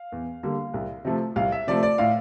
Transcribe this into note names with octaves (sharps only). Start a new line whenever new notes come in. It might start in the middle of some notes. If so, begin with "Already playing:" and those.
Already playing: F5
E2
D3 G3 A#3
C2
C3 F3 A3
C2 F5
E5
C3 F3 A3 D5
D5
A2 F5